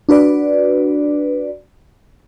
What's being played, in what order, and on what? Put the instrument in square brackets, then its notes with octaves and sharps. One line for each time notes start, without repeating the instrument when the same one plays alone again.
[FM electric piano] D4 F#4 B4 D5